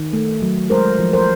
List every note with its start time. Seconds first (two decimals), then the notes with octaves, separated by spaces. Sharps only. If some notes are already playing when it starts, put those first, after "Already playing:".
Already playing: D#3
0.13 A3
0.42 F#3
0.70 G#3 A#4 C5
0.99 F3
1.13 A#4 C5